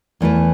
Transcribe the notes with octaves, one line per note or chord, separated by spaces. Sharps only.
E2 E3 A3 E4 B4